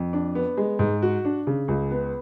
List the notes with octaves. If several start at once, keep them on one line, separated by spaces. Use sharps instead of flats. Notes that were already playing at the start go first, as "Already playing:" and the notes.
Already playing: F2
D4
B3
G#3
G#2
F#4
D4
C#3
C#2
B3